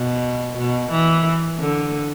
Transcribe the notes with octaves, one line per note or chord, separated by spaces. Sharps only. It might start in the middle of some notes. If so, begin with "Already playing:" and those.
Already playing: B2
B2
E3
D3